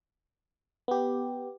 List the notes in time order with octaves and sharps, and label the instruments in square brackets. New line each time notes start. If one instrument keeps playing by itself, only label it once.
[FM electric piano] B3 G4